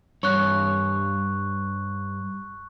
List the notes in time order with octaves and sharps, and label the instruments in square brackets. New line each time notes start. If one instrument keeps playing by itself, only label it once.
[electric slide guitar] G2 C#5 [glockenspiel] C#6 F#6